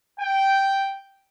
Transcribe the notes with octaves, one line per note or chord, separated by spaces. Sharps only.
G5